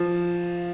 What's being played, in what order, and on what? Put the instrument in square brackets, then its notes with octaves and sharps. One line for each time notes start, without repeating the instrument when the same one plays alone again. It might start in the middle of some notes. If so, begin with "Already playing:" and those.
Already playing: [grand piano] F3